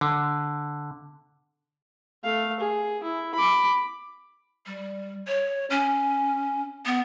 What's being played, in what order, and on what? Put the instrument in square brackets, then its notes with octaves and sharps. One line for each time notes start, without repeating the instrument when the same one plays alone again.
[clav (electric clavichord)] D3
[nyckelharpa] A3 F5
G#4
E4
B5 D6
[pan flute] G3
C#5
C#4
B3